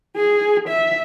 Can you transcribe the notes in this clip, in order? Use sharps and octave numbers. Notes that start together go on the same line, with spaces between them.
G#4
E5